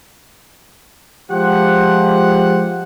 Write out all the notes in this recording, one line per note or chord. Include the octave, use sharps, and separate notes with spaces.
F3 G#3 G4 C5 F#5